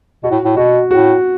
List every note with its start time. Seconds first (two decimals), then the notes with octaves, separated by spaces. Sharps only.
0.24 B2 F#4
0.31 A2
0.44 A2
0.56 B2 F#4
0.90 A2 F#4